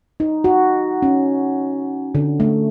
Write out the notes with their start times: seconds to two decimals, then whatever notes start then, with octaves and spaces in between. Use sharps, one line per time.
0.20 D#4
0.44 F#4
1.02 C#4
2.15 D3
2.40 A3